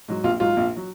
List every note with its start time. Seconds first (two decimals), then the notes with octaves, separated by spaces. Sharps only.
0.08 G#2 F#3
0.24 A#1 F4
0.40 G#2 F#3 F4
0.57 A#1
0.76 F#3